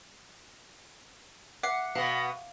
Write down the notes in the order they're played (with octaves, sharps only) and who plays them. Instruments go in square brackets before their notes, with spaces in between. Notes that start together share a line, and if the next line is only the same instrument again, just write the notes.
[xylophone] E5 D6 C7 [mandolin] F#5
[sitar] B2 B3 [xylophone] F5